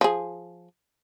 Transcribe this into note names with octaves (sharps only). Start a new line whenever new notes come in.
F3 G#4